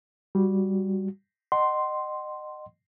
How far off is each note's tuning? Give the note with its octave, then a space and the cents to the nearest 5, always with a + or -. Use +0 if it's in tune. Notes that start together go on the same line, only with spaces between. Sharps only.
G3 +0 F#4 +0
D#5 -30 F#5 +35 C6 +0